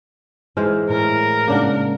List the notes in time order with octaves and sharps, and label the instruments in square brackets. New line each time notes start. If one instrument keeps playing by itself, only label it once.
[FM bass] G#2 [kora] E3 G#3 C5 [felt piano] F6
[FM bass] A2 [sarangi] A#4
[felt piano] G#2 C#3 [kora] A#3 D4 F#5